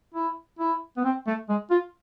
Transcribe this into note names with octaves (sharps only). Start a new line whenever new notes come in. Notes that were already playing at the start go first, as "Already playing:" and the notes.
E4
E4
B3
C4
A3
G#3
F4